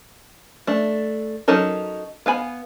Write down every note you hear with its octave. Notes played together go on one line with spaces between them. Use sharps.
A3 D4
F#3 C#4 D#4 A4 A#4
B3 F5 G#5 B5